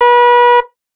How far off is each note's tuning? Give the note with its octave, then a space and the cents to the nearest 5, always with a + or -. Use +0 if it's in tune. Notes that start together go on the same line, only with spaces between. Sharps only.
B4 -35